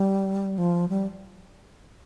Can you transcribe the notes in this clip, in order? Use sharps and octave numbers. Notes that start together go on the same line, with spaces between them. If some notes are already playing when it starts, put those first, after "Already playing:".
Already playing: G3
F3
G3